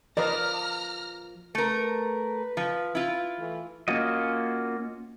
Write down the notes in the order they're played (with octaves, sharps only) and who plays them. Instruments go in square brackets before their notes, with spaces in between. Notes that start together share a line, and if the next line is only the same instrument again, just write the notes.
[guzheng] F3 A#3 [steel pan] A#4 D#5 [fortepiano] B4 D5 [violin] A#5 F6
[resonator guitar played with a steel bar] A3 A#4 [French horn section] B4
[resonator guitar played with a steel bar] F3
E4 F4
[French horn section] E3 A3
[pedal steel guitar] A#3 C#4 F4 F#4 D#5